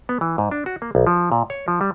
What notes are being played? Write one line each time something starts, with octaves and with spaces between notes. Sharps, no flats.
B3
E3
G#2
D4
F#4
A#3
B1
F3
A#2
C#5
F3
G3